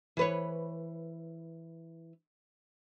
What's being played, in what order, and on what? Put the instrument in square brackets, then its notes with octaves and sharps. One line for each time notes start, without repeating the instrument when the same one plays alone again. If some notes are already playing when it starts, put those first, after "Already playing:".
[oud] E3 B4 C#5